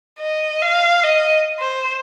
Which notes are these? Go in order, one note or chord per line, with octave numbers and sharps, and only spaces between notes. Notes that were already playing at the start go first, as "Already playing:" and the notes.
D#5
F5
D#5
C5